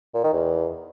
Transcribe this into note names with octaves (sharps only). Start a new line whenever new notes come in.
A#2
D#3
E2